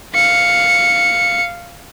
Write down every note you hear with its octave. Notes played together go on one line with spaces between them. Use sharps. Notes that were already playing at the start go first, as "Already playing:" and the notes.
F5 C#7